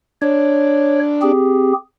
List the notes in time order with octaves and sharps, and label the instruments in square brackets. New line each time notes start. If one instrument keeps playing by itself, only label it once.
[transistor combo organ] D4 [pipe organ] C#5
[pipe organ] C4 G4 G#4